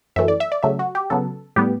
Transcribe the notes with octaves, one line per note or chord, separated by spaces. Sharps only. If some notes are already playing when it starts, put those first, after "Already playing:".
F#2 E3 A3 E5
D5
E5
D5
C#3 F#3 A3 E5
F#4
G4
C#3 F#3 B3 A4
A2 G3 B3 G4